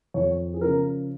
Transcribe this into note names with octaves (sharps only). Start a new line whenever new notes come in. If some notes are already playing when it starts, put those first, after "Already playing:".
F2 C#5
G#4
C#3 F3 A#4